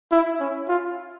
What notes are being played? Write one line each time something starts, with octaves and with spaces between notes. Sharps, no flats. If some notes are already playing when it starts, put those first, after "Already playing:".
E4
C#4
F4